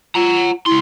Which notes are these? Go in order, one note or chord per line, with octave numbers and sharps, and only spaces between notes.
F4 F#5 A#5
C#2 E4 C6